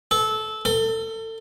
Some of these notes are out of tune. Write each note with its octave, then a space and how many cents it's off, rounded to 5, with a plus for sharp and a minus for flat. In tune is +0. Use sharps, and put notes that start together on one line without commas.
A4 -20
A4 +30